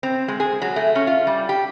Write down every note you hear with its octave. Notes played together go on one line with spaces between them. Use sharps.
C4
G#3
G#4
F#3
A3
C#4
F4
G3
G4